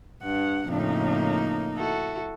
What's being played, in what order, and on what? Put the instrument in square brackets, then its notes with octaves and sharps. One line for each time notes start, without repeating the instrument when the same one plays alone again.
[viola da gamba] G2 [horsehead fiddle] F#5
[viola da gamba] F2 A2 C#3 [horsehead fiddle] A#3 D#4
[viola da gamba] E4 F#4 A4